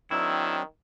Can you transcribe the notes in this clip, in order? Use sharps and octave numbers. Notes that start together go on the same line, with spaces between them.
D#3 F#3 C4 D4 E4